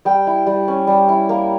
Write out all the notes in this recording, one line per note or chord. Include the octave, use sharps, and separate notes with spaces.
G3 G5
E4
G3
C#4
G3
E4
A#3